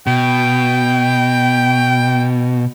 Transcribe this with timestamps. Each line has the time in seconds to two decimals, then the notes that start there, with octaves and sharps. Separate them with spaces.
0.07 B2 G5